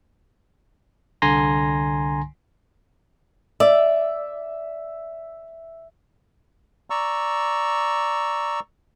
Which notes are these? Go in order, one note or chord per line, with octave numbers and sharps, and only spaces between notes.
C2 D3 G#5 A#5 C6 A#6
D5 E5
D5 A#5 C#6 E6